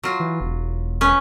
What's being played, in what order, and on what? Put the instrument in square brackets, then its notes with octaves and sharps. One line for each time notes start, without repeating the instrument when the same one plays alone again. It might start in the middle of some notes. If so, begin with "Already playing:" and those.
[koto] F#3 F4
[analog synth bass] E3
E1
[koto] C#4 B4